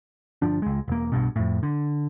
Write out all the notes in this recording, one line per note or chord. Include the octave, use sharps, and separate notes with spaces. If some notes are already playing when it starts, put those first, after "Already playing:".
G1 F3 D4
C#2 G#3
E1 A#3
B1 G2 B2
F2 A2
D3